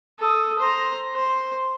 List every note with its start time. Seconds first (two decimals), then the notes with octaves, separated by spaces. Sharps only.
0.19 A4 D#6
0.59 C5 A#5
1.14 C5